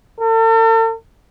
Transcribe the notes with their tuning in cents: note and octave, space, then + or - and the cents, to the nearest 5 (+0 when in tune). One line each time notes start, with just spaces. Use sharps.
A4 +45